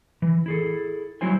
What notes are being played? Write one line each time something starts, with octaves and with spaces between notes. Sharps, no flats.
E3
E4 G#4 A4
F#3 G3 E4 C5 G#5